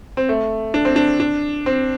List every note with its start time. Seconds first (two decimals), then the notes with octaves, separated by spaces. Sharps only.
0.17 C4
0.29 A3
0.74 D4
0.85 C4
0.96 D4
1.20 D4
1.66 C4